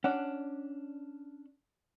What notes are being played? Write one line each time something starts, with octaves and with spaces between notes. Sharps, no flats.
C#4 D4 F#5